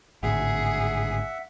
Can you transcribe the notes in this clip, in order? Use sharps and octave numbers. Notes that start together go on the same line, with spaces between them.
G#1 A2 D3 G#4 E5 F#5